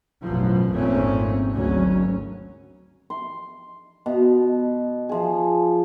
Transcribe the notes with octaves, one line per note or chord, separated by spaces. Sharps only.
A1 F#2 B2 F3
G#1 F2 A#2 A3 C4 C#4
G#1 D2 F#3 C#4
C6
B2
F3 G#4